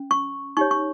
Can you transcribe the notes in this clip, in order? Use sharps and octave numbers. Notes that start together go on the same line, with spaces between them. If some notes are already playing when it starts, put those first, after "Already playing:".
Already playing: C#4
C#6
D#4 G4 C#5 C#6
C#6